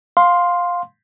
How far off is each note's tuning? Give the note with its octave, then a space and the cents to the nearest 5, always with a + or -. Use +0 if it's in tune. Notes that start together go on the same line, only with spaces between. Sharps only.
F5 +15 C6 +0